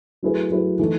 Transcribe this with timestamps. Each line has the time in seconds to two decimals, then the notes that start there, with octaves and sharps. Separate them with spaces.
0.23 F#3 A3 E4 G#4 B4
0.51 F#3 A3 E4 G#4 B4
0.79 E3 A3 D#4